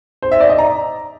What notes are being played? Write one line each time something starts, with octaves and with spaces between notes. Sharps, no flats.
C5
E5
D5
D#5
A#5